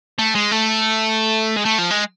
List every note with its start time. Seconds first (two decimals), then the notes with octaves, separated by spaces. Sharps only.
0.18 A3
0.35 G#3
0.51 A3
1.56 G#3
1.65 A3
1.78 F3
1.91 G#3